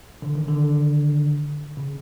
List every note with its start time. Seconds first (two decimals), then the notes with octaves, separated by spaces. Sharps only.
0.22 D3
0.35 D#3
0.49 D3
1.77 C#3